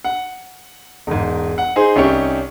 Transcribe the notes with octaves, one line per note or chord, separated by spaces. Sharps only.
F#5
E1 G#2
F#5
D#4 G#4 C5
C2 C#4 D#4 G4 C#6